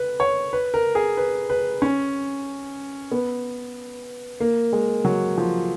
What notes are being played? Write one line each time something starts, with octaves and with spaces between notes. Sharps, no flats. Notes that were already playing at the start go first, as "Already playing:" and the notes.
Already playing: B4
C#5
B4
A#4
G#4
B4
B4
C#4
B3
A#3
G#3
F#3
F3